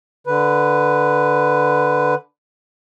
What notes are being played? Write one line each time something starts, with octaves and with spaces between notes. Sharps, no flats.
D3 B4